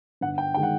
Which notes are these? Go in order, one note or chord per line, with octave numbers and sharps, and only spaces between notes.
G1 F#5
G5
D#3 G#3 G5
F#5